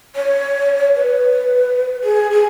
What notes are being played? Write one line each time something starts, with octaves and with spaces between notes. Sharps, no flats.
C#5
B4
G#4
G#4